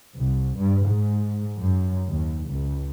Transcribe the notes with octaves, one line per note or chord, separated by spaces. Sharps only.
C2
G2
G#2
F#2
D#2
C#2